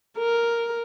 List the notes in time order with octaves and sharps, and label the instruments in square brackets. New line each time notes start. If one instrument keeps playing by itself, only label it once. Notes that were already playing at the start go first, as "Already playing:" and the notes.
[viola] A#4